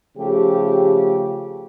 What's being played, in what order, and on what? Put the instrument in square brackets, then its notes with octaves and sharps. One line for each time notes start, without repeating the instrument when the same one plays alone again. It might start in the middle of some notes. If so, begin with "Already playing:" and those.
[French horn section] C#3 F3 A3 G4